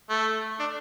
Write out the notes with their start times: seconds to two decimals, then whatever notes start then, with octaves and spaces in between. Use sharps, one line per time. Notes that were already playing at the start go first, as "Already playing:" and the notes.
0.10 A3
0.59 D4